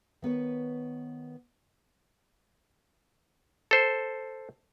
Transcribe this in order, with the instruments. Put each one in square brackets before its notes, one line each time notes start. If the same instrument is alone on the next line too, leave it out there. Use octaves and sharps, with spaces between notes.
[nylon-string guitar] D#3 B3 B4 C#5
[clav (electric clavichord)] A4 C5